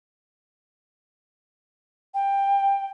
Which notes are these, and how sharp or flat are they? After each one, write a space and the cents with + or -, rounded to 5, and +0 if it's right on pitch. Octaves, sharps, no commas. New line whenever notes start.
G5 +15